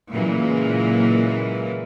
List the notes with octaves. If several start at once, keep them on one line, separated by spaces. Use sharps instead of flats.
A#2 C#3 E3 F#3 G#3 A#3